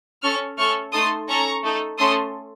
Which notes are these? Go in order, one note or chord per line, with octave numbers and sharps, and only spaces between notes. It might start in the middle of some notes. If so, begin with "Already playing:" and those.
C#4 A4 C#6 F6
A3 C#4 A4 C#6 F6
A3 D#4 A4 C6 D#6
C#4 A4 A#5 C#6
A3 D#4 A4
A3 C#4 A4 C6 D#6